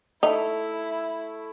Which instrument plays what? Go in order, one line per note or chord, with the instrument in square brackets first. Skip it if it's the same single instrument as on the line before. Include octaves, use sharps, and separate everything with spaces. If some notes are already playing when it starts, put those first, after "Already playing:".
[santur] A3 [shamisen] D#4 [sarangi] E4